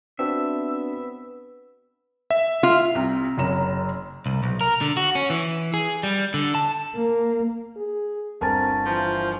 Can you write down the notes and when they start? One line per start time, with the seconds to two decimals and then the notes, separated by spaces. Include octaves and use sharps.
0.19 B3 C4 D4 F#4 E5
2.31 E5
2.63 F4
2.94 C2 C3 C4
3.37 F#1 F#2 A#5 E7
4.26 C2
4.43 B1
4.61 A#4
4.81 D3
4.97 F#4
5.15 C#4
5.30 E3
5.74 G#4
6.03 G3
6.34 D3
6.55 A5
6.95 A#3
7.76 G#4
8.41 G1 C4 A#4 G#5 A5 A6
8.85 E3 F3